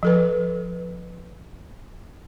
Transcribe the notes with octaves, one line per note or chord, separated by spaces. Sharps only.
F3 A4 B4